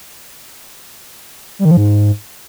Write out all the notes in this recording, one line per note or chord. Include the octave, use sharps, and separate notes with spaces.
G3
D#3
F3
G#2